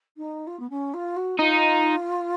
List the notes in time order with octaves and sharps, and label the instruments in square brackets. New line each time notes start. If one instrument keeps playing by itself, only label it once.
[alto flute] D#4
F4
B3
C#4
F4
F#4
[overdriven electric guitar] D#4 [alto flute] F4